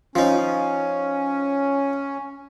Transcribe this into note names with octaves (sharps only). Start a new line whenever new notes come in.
F3 C#4 D#4